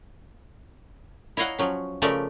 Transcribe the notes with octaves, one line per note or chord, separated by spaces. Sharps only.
E4 C#5 D#5 F5 F#5 A#5
F3 F#3 C#4
C#3 F3 A3 A#4 D5 E5